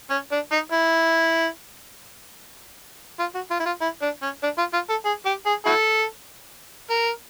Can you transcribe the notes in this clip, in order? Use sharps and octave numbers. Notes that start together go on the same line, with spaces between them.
C#4
D4
D#4
E4
F4
F#4
F4
E4
F4
E4
D4
C#4
D4
F4
F4
A4
G#4
G4
G#4
E4 F#4 A4
A#4